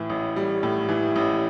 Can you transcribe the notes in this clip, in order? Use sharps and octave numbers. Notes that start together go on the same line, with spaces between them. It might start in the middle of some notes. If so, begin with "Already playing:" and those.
Already playing: A2 E3
A1
G3
A2
E3
A1